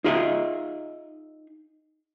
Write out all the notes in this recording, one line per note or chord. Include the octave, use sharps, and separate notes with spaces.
D#4 F4 G#4 D#5 E5